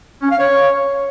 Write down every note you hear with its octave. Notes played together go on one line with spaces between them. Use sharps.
C#4
F5
C#5